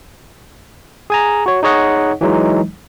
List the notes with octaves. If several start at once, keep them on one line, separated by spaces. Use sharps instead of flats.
G#4 G#5 A#5
F#4 C#5
D#4 G#4 C#5 D#5 F#5
E3 F#3 G#3 D#4